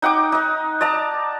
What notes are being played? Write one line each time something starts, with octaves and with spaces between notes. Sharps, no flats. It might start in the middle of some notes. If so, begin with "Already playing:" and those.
D#4 F#5 G5 D6
D#4 D#5
D5 D#5 A5 A#5